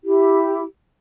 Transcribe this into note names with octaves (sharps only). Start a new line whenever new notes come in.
E4 G4